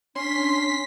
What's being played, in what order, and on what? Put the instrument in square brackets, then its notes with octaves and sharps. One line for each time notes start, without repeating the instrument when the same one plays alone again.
[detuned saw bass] C#4 [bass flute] D4 [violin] C6 [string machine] B6